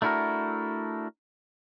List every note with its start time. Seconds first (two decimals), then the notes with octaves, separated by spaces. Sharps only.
0.02 A3 D4 E4 F#4 A#4